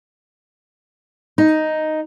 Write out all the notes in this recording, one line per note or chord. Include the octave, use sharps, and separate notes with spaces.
D#4